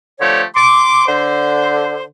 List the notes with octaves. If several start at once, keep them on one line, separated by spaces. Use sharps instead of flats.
D3 F3 A3 G4 C#5
C6 D6
D3 C5